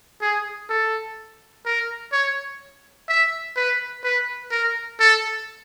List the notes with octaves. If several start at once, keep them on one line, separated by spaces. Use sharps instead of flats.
G#4
A4
A#4
C#5
E5
B4
B4
A#4
A4